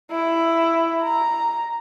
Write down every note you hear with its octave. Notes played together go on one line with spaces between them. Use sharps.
E4
A#5